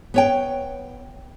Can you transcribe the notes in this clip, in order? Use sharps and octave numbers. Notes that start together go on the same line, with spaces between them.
B3 C#5 G5